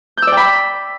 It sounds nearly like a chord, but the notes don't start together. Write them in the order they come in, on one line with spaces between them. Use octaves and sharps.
G6 E6 D5 G5 B5